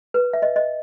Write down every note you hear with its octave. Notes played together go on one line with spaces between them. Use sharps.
B4
E5
D#5
D#5